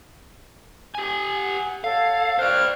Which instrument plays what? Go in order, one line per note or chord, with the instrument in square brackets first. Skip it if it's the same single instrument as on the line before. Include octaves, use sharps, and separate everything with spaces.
[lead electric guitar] G4 G#5
[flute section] F#5
[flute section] A4 C#5 F#5 [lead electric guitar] F5
[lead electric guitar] C5 D5 [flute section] G5 F6 F#6